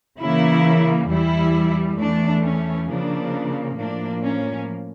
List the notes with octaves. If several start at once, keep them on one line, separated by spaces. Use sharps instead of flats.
C#3 E3 A#3 E4
E2 E3 G3 E4
E2 E3 A3 D4
C#4
C#3 F3 A#3 D4
A2 F3 A#3 D4
C#4